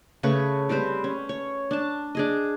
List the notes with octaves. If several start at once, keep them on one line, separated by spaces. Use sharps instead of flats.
C#3 A3 B4 C#6
G3 C4 B4 C5
C#4
C#5
D4 A5
D4 G#4 D#5